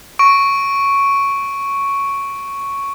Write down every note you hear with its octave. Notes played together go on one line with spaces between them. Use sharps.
C#6 D7